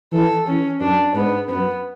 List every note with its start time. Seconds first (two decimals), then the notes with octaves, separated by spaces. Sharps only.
0.12 E3 A4
0.47 E3 C#4
0.80 F#2 D4
1.15 G#2 B3
1.49 F#2 B3